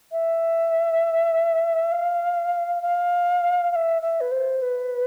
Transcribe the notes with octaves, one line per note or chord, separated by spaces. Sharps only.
E5
F5
F5
F5
E5
E5
B4
C5
B4